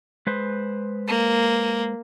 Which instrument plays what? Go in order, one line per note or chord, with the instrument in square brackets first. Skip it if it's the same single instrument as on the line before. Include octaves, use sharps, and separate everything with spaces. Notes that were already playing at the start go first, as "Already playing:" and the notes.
[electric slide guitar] G#3 B4 C5
[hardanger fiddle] A#3